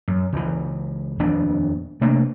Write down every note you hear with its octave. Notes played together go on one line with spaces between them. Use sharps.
F#2
C#2 E3
D#1 F2 B3 D4
C3 A3 A#3 D4